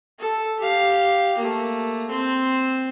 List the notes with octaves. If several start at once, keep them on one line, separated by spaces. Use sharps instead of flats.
A4
G4 F5
A3 A#3
C4 C5